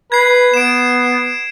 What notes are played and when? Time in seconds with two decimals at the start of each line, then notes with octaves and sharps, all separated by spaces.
0.12 B4 G#6 C7
0.54 B3 D7 E7